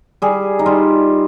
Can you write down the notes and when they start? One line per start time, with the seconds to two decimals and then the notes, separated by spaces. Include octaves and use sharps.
0.22 G3 G#4
0.59 D#4
0.66 G3 F4